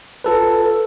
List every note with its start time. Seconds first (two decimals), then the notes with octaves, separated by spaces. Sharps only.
0.24 F4 A4 B4